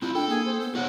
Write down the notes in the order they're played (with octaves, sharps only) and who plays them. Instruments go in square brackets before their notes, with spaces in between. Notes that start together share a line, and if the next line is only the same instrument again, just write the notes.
[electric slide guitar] C4 E4 [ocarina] F4
[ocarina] D4 [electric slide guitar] A4 [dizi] G5
[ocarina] A#3 [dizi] G#4
[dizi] C5
[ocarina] B3
[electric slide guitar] F4 C5 C#5 [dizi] F#5